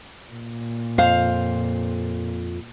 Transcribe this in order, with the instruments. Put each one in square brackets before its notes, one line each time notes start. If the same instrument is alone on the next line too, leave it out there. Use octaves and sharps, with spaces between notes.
[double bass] A#2
[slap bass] F2 [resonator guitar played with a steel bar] C5 F5